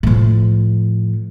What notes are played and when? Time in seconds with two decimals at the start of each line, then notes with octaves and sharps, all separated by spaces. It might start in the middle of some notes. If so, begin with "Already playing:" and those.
0.03 A2 F3